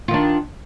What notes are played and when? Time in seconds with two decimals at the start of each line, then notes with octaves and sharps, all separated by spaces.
0.08 F4
0.11 D#3
0.14 D4